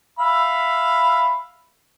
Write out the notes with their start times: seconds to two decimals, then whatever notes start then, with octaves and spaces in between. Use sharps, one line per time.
0.19 E5 F5 B5